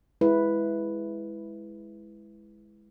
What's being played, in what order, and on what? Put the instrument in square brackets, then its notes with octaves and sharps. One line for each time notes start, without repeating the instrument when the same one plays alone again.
[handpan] G#3 E4 B4